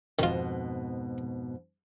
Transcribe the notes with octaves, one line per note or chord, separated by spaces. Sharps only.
F2 G#2 B2 D#3 F4